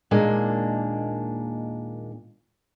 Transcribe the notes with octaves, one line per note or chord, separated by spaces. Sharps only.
D#2 A#2 G#3 A#3 D4